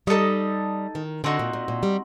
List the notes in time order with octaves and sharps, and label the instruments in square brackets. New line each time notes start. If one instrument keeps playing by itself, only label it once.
[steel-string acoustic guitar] G3 [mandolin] D#4 A4 D#5
[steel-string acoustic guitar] D#3
[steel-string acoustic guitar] D3 [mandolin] C4 D#4 F#4
[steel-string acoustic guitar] A#2
A#2
A#2
G3